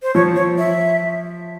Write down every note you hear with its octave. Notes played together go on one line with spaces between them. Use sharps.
C5
F3 C#5
C#5
E5